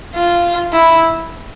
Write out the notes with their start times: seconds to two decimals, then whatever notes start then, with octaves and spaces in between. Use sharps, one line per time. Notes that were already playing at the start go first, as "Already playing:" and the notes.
0.15 F4
0.73 E4